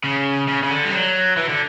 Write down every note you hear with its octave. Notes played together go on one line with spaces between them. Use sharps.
C#3
C#3
C#3
D3
G3
F#3
E3
D3